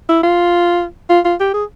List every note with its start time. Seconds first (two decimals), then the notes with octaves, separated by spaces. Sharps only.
0.09 E4
0.24 F4
1.10 F4
1.25 F4
1.40 G4
1.54 G#4